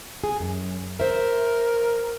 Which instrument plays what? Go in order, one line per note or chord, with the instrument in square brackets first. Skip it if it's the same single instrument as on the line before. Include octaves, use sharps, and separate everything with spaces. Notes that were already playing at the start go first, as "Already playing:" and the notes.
[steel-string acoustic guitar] G#4
F#2
[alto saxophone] A#4 [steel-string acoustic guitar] C5 E5